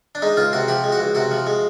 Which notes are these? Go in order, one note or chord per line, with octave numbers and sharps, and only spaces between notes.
D4
G#3 D#4
C#2 F4
C3 F#4
F3 G4
G#3
F#4
C#2
C3 F#4
F3
G#3